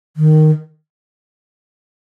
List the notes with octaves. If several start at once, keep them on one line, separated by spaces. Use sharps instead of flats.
D#3